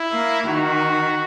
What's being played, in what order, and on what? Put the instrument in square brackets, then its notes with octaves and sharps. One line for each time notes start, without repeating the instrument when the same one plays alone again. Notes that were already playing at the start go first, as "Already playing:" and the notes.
Already playing: [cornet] E4
[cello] A#3
[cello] D#3 [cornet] F#4